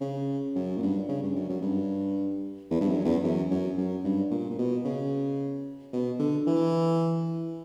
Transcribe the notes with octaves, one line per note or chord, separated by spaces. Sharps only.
C#3
F#2
A#2
G2
C#3
G2
F#2
F#2
G2
E2
G2
F#2
E2
F#2
F#2
F#2
G2
A#2
A#2
B2
C#3
B2
D3
E3